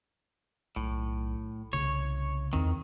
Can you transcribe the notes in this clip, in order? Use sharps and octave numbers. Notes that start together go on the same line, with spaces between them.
B1 A2
C2 C#3 C#5
E2 D#3 C4